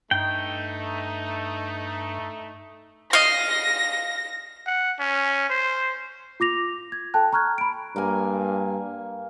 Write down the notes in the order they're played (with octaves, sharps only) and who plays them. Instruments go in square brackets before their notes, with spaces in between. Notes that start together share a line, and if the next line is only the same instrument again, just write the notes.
[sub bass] G2 [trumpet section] A3 D#4 [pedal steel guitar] G5
[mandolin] D#5 F5 [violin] A#6
[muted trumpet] F#5
C#4
C5
[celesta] F4 D6 A#6 F7
G#6
A4 G5 A5 F#6
A#5 C#6 F6 F#6 G#6
B5 D7
[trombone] G2 [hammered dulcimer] A#3 G#5